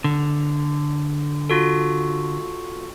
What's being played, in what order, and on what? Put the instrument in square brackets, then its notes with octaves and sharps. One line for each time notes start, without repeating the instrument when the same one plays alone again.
[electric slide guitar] D3
[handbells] F4 F#4 A4